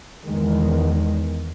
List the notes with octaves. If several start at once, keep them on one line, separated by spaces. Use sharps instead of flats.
E2 D#3 G#3